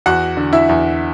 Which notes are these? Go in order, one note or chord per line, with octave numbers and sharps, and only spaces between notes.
E2 F#4 F#5
D3
E4 E5
E2